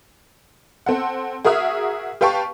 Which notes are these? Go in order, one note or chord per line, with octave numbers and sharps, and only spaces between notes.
C4 A4 F#5
F#4 G#4 A#4 E5 D#6 F6
G4 B4 F5 G5 A5 C#6